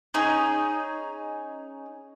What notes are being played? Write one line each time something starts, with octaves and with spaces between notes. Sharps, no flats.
C#4 D#4 G#4